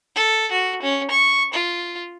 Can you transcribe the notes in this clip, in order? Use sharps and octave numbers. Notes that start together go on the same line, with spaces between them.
A4
F#4
C#4
C#6
F4